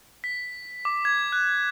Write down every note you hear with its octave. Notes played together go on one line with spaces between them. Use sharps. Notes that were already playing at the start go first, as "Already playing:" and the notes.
B6
D6
G#6
F#6